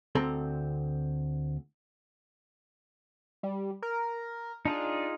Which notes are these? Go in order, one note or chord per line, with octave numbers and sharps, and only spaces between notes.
D2 C4 A4 A#5
G3
A#4
D4 D#4 F4 G#4